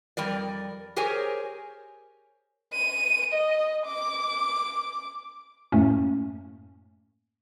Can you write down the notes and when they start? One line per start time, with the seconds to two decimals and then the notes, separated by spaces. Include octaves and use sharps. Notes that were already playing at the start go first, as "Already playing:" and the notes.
0.17 F2 G3 A#4 D5
0.96 G4 G#4 A#4 C5 C#5 G#5
2.73 D#7
3.33 D#5
3.86 D6
5.72 F#2 A2 A3 A#3 C#4